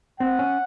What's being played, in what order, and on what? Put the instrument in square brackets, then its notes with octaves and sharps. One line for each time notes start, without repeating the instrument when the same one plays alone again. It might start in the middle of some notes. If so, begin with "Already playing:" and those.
[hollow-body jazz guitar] C4 [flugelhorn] F#5
[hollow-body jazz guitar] C#4